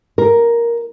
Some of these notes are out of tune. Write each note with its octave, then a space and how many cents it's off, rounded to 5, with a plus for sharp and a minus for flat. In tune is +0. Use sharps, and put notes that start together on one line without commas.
A#4 +5